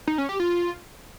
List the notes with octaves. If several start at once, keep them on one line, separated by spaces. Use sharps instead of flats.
D#4
C#4
G4
F4